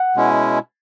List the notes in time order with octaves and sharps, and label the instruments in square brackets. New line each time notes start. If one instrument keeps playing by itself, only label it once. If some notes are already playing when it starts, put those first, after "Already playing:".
Already playing: [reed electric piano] F#5
[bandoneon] B2 G#3 C#4 E4